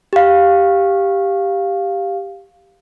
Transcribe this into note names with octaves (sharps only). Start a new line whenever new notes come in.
G4 F5